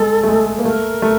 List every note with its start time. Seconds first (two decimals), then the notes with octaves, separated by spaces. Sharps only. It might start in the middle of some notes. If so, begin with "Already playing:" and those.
Already playing: G#3 A4
0.23 A3
0.29 G#3
0.59 A#3
0.65 A3 A#4
1.02 A3